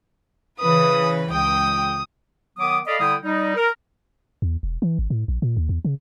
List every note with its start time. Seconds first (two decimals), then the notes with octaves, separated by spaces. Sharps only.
0.60 C#3 E3 B4 D#6
1.33 C#2 G5 D#6
2.58 D#3 F#3 B3 D6 D#6
2.86 A4 D5 D#5 F5 B5 D#6
2.99 D3 G3 E4 G5 D#6
3.24 G3 D#4
3.57 A#4
4.42 E2
4.63 E1
4.82 E3
4.99 G#1
5.10 A2
5.28 A#1
5.42 A#2
5.57 D#2
5.69 E2
5.85 C#3